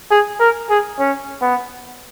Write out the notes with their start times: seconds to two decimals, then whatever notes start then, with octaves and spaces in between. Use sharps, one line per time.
0.11 G#4
0.40 A#4
0.70 G#4
0.99 C#4
1.42 B3